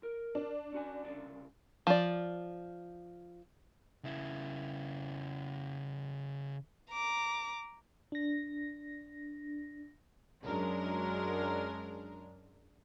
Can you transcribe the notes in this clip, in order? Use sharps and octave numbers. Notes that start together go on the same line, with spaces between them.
A#4
D4
C#4 F#4 G#5
C2 C#3 D5
F3 D5
C#3 E4
A#5 D6
D4 A#6
F#2 F#3 G#3 D4 A#4